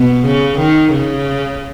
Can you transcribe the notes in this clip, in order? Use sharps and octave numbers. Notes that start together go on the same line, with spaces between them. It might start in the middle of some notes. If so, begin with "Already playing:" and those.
Already playing: B2
C#3
D#3
C#3